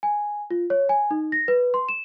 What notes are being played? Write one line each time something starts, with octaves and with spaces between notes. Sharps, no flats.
G#5
F4
C#5
G#5
D#4
A#6
B4
C6
E7